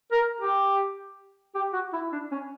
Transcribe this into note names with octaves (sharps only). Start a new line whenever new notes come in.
A#4
G4
G4
F#4
E4
D4
C#4